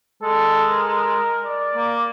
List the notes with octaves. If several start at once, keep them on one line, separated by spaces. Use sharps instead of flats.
G#3 A4
A#4
D5
A#3